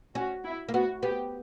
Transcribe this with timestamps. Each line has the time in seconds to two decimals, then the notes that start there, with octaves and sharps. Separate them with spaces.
0.15 C#4 F#4
0.44 E4
0.68 A#3
0.74 B3 F#4
1.03 B3 G4